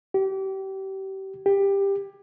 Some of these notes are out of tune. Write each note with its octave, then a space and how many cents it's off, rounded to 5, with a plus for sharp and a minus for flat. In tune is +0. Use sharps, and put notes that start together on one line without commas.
G4 -30
G4 +15